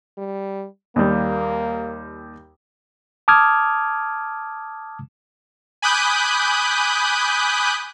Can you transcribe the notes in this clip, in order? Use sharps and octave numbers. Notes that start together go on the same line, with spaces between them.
G3
D#2 G3 A#3
A5 D6 D#6 F6 G#6
G#5 B5 D6 D#6 F#6 G6